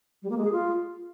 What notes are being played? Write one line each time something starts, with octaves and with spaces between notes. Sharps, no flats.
G3
A#3
G#3
G#4
F4